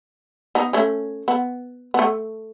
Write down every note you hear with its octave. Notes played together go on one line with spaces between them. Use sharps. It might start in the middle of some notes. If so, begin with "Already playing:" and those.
B3 D#4
A3 C#4
B3
B3
A3